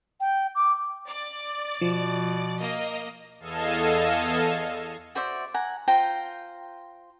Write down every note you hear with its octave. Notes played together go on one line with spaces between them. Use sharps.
G5
D6
D5
B2 F3
A#3 D#5
E2 A4 D#5 F5 G#6 E7
F#4 C5 D5 E5
F#5 G#5 A#5
F4 C5 G5 A#5